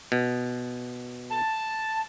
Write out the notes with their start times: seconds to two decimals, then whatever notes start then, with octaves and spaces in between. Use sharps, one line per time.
0.12 B2
1.31 A5